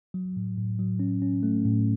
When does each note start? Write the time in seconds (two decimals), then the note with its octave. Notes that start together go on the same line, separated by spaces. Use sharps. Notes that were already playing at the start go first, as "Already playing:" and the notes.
0.14 F#3
0.37 A2
0.58 A2
0.79 F#3
1.00 C#4
1.22 C#4
1.43 A3
1.65 A2